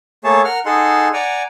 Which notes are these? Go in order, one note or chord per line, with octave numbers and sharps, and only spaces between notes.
A3 A#3 G#4 C#5 A5
A#4 F#5 F6
D#4 G#4 A4 F#5 C6
D5 F#5 G#5 A#5